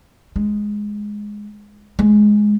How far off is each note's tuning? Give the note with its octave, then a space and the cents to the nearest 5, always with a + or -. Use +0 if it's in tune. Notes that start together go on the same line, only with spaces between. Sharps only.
G#3 +0
G#3 +10